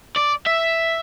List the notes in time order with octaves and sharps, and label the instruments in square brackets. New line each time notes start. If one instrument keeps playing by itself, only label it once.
[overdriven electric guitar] D5
E5